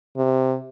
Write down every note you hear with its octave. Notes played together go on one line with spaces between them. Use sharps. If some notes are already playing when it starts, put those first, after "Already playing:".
C3